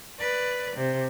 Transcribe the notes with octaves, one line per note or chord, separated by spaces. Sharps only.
B4 D5
C3